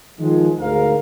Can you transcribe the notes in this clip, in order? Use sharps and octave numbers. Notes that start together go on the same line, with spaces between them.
D#3 F3 G#3
D2 G#2 G#4 A#4 F5